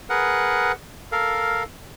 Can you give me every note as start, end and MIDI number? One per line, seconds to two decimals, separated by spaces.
0.10 0.72 68
0.10 0.72 70
0.10 0.72 71
0.10 0.72 78
1.12 1.63 69
1.12 1.63 70
1.12 1.63 77